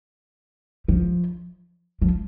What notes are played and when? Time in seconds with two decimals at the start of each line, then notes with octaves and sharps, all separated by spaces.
0.88 F3
2.02 F3